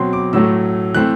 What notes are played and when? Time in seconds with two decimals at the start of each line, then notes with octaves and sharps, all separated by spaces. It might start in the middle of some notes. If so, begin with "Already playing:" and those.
Already playing: B2 F#3 C4 C6
0.13 D6
0.33 A2 F#3 A3 E6
0.94 E3 A3 C4 F#6